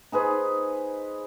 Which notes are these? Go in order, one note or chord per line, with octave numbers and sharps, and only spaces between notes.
D#4 G#4 B4 C5